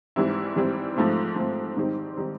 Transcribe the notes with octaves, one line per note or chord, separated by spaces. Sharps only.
G#2 E3 G3 C4 E4
G#2 E3 G3 C4 E4
G#2 F3 A3 C4
G#2 F3 A3 C4
G#2 D#3 G3 C4 D#4
D#3 G3 C4 D#4